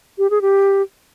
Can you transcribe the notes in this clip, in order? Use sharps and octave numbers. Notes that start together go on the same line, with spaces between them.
G4
G#4
G4